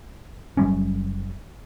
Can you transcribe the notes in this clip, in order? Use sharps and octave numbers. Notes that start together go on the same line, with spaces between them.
F#1 F#3 G3 C#4